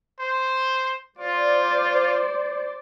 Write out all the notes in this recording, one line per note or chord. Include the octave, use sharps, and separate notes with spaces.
C5
F4 C5 D5